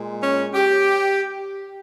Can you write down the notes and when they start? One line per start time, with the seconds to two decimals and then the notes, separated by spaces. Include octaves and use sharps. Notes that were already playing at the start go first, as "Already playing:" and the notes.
Already playing: A#2 G#3
0.22 C#4
0.54 G4